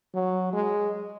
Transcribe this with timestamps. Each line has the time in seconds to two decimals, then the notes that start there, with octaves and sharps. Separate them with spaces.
0.14 F#3
0.53 G#3